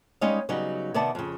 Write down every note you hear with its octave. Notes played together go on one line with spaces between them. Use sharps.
G3 G#3 C#4 D#4 C#5 F5
C#3 F#3 G3 B3 D#4
C3 D#3 B3 D5 A5
F2 C#3